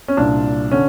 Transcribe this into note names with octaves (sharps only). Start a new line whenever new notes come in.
C#4
C2 A#2 D4
D3 C#4